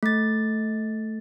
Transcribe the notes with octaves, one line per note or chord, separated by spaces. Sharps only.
A3 A6